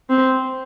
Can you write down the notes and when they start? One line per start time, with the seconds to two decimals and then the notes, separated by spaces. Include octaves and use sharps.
0.10 C4